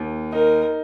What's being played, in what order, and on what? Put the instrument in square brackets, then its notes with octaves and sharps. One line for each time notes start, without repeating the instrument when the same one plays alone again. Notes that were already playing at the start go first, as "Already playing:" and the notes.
Already playing: [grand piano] D#2
[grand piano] D#4 [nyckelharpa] A#4